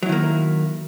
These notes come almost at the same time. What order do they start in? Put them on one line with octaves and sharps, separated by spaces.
F#3 E4 D#3 A#3